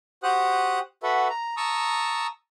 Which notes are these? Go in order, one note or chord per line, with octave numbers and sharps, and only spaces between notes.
F#4 G4 C5 F#5 D#6 F#6
F#4 A4 B4 E5 F#5
A#5
A5 A#5 C#6 D#6 E6